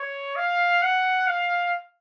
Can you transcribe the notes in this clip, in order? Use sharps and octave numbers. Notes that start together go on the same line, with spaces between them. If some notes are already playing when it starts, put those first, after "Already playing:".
Already playing: C#5
F5
F#5
F5